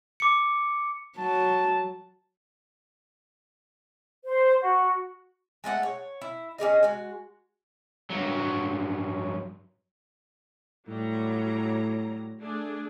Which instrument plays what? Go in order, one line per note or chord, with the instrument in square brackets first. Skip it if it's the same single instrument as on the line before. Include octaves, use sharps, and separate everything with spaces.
[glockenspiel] D6 C#7
[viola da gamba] F#3 [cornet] A5
[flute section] C5
F#4
[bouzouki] G#3 A3 B4 F#5
C#5
E4
C#4 G4 G#4 D#5
G#3 F#4
[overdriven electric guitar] G2 F#3
[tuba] A2 [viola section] F#3 G3 A#5
[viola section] A3 D4 G#4